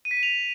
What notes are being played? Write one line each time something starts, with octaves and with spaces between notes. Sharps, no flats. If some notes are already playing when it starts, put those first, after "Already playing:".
D#7
B6
D#7
F7